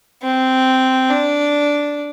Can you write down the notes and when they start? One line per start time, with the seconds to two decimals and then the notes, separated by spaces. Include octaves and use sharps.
0.23 C4
1.09 D4